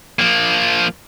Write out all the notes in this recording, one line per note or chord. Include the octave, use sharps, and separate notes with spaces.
F3 A#3